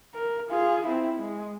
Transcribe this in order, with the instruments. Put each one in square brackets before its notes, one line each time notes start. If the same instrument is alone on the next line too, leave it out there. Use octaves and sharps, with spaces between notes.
[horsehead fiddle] A#4
F4 G#4
C4 E4
G#3